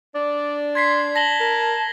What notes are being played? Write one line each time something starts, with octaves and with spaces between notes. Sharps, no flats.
D4 D5
C6 G#6 B6 C7
A5 A#6 F#7 G7
A#4